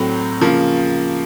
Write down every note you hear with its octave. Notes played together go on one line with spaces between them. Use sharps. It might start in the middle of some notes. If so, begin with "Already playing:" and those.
Already playing: A2 F#3 C4
C#3 F3 A#3